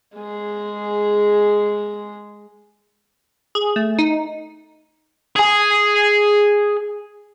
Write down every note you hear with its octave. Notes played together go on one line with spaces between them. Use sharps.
G#3 G#4
G#4
A3
D#4
G#4 G#5